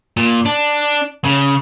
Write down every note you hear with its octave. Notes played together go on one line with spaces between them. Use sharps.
A#2
D4
C#3